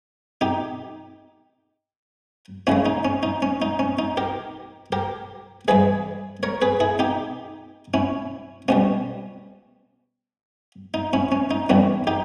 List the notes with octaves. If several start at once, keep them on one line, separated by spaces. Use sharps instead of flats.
D#4 G4
D#2 C#3 G#3 C#4 E4
D#4
C#4
D#4
C#4
D#4
C#4
D#4
G4 A#4
G4 A#4
G2 E3 G#3 G#4 B4
A#4 C#5
G#4 B4
E4 G#4
D#4 G4
C#4 E4
C#2 B2 G3 C#4
D#4
C#4 E4
C#4
D#4
E2 D#3 G3 C#4 E4
D#4 G4